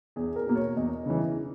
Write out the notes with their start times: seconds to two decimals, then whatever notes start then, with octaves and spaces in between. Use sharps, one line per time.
0.16 E2 G#4
0.36 A#4
0.46 B2 A#3
0.55 C#5
0.77 E2 D#5
1.06 C#3 E3